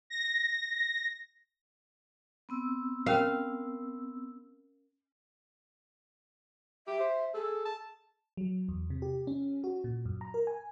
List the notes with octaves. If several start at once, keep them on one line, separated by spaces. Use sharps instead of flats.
A#6
B3 C4 E6
C#4 A#4 F5
G4 E5
C5
G#4 A4
A5
F#3
E2
C3
G4
C#4
F#4
A#2
F#2
A#5
A#4
G#5